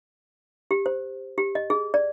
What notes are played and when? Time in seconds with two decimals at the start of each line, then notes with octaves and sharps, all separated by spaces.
0.71 G4
0.86 C5
1.38 G4
1.55 D#5
1.70 G#4
1.94 D5